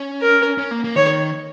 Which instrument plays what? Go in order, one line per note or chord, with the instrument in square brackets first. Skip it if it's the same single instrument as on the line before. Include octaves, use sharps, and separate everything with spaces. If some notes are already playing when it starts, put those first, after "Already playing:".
Already playing: [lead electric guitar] C#4
[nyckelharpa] A#4
[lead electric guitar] C#4
A#3
A#3
[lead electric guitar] D#3 [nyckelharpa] C#5